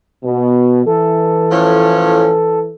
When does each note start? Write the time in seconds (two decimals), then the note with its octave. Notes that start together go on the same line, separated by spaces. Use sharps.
0.24 B2
0.86 E3 A4
1.51 A2 F3 C#4